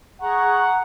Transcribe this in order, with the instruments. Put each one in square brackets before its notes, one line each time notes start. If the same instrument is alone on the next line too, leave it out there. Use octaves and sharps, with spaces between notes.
[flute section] G#4 A#5 C#6 [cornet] F#5